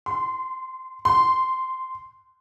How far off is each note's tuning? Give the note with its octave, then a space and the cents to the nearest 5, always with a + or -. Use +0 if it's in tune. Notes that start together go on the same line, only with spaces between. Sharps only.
C6 -25
C6 -10